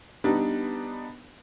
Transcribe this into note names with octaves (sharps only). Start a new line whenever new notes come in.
G3 B3 D4 D#4